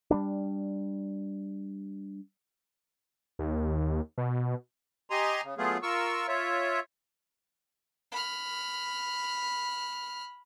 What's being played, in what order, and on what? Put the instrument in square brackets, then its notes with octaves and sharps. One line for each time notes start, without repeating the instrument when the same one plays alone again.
[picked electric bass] G3 A#3 D4
[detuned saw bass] D#2
B2
[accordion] G4 D#5 G#5 A#5 C6
C#3
F#3 A3 B3 F4 G#4
F4 A#4 C#6 E6
F4 C#5 E5
[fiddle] B5 F6